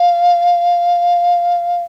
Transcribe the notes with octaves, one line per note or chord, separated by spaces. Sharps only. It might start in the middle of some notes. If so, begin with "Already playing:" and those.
Already playing: F5